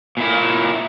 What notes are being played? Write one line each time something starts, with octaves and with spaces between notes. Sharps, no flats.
A#2 E4